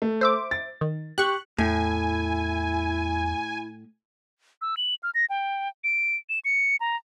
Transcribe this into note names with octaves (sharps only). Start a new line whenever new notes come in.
A3
C5 E5 D6
A6
D#3
G4 C#6 F#6
E2 A2 E4 G#5
E6
F#7
F6
A#6
G5
D7
E7
C#7
A#5